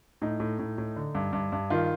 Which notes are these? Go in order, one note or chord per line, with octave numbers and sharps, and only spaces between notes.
A2 D#4
A2
A2
A2
D3
G2
G2
G2
D#3 F4